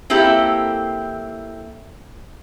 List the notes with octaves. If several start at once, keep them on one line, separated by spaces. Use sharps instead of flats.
A#3 C4 E4 G4 A4